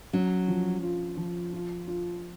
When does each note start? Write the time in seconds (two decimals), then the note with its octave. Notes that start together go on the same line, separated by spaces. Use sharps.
0.13 F#3 C#4
0.48 F3
0.83 F4
1.17 F3
1.53 F4
1.88 F4